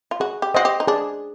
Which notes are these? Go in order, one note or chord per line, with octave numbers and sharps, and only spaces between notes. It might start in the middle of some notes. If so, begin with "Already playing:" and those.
F4
F#4 G#4
G4
F#4 C5 D#5 G5 C6
G4
D#4
D4 G#4